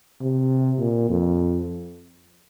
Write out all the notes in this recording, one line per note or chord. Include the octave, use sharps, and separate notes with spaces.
C3
A#2
F2